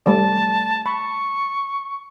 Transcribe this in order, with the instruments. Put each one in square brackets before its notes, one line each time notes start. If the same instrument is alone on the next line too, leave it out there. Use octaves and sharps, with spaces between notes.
[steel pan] G3 A3 D5 [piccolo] A5
[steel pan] B5 [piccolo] C#6